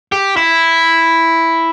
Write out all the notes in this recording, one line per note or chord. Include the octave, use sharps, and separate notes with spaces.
G4
E4